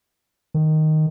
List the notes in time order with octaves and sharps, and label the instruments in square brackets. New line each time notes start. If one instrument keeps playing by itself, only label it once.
[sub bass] D#3